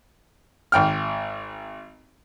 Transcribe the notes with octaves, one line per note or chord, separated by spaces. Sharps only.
G#1 G5 F6